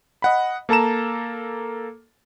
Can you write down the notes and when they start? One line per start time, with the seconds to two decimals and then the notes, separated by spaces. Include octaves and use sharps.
0.22 D#5 F#5 B5
0.69 A#3 A4 A5 A#5 E7